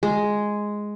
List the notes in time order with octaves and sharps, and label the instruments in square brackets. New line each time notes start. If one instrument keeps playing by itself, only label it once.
[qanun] G#3